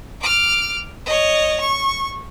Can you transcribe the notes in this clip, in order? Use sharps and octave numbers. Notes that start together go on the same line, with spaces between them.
D6 F6
C#5 D#5
C#6